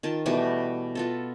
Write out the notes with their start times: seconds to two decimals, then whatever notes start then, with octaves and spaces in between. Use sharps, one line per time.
0.03 D#3 F4 A5
0.26 B2 E3 G3 A3
0.95 B3 F4 A4